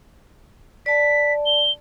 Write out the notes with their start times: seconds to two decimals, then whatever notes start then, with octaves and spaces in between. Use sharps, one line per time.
0.86 D5 A5 B6
1.46 G7